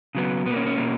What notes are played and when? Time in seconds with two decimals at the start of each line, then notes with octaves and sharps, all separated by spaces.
0.15 C#3 F#3 B3
0.46 B2 B3
0.50 A#3
0.56 C#4
0.67 C#4
0.77 B2 A#3